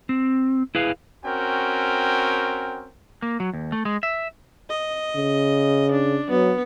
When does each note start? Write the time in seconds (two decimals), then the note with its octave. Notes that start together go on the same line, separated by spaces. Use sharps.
0.09 C4
0.75 E4 G#4 B4 F5
1.25 C4 C#4 F#4 A#4 G5
3.22 A#3
3.40 F#3
3.53 D#2
3.72 A3
3.85 G#3
4.03 E5
4.70 D#5
5.16 C#3
5.92 D4
6.30 F#3 B3